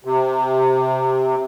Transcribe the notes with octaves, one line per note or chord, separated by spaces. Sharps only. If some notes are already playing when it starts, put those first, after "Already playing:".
C3